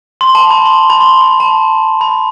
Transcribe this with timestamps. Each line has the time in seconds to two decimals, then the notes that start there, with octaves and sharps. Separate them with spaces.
0.21 C6
0.35 A5
0.51 B5
0.66 C6
0.90 B5
1.01 C6
1.21 B5
1.40 A5
2.01 B5